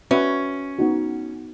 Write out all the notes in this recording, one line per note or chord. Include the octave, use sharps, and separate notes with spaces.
C#4 F#4 B4 E5
B3 D#4 F#4